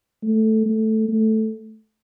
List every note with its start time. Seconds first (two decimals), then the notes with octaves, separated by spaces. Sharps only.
0.23 A3
0.66 A3
1.09 A3